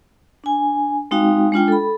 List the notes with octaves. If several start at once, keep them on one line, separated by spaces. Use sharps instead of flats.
D4 G#5
G#3 C4 D#4 F#4 F5 G5
G#3 D4 F4 G5
A4 B5